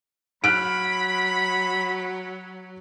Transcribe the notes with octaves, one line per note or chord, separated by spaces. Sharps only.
F#3 B5 F6 F#6 D7